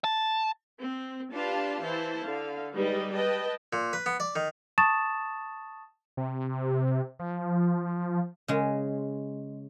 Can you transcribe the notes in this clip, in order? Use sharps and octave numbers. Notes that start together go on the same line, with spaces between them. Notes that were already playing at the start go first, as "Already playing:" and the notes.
A5
C4
D4 F4 G4 B4 F5 A5
E3 E4 C5 A5
D3 F5
G3 G#3 D#4 B4 D5 D#5
B4 D#5 G5 A5
A#2
B4
B3
D5
D#3
A5 C#6 D#6 A6 E7
C3
F3
C#3 G#3